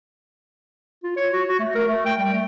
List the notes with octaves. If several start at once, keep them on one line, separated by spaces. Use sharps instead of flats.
F4
C#5
F#4
F#4
A3
A#4
A3
G5
G3
A3